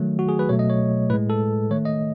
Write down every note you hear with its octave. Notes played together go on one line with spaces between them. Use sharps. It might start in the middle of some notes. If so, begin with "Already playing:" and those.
Already playing: D#3 F#3 A3
F#4
G#4
B4
B2 F#3 A3 C#5
D#5
C#5
A2 G#3 B4
A4
D#3 A3 C#5
D#5